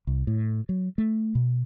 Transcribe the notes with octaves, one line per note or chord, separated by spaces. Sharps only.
C2
A2
F#3
A3
B2